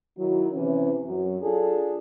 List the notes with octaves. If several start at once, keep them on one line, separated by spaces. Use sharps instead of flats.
D#3 F#3 E4
C3 E3 C#4
F#2 F#3
D4 F4 G#4 A4